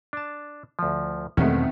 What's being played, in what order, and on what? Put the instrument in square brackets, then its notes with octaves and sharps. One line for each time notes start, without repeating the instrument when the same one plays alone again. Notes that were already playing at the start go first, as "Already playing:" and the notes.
[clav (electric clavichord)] D4 A5
D2 F3
[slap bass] E2 B2 G#3 [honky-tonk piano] D#3 A3 [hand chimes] C4 [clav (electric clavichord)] C#4